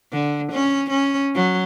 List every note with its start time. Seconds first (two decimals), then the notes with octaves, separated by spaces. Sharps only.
0.12 D3
0.52 C#4
0.90 C#4
1.35 F#3